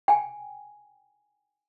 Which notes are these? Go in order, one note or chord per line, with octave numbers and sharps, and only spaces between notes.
G5 G#5